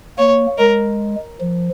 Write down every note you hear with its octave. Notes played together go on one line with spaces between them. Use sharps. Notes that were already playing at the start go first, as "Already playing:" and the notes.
A#3 C#5
G#3 A#4
F3